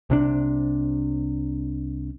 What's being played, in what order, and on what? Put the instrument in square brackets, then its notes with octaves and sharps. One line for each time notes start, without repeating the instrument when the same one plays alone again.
[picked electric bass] C2 C3 D4